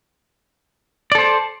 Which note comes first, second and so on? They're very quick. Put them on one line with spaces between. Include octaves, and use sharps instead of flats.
D5 A4 C5